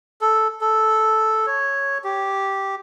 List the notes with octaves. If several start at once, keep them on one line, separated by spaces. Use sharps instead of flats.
A4
A4
C#5
G4